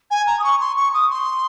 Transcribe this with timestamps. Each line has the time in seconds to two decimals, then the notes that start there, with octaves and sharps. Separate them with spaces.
0.11 G#5
0.27 A#5
0.39 D#6
0.44 C#6
0.60 C6
0.77 C#6
0.94 D#6
1.10 C6